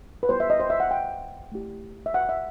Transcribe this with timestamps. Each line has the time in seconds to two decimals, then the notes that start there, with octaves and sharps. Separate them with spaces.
0.23 B4
0.29 G3 B3 E4 G4 C5
0.40 E5
0.50 D#5
0.60 C5
0.70 E5
0.80 F#5
0.91 G5
1.52 A3 E4 G4
2.06 E5
2.14 F#5
2.29 E5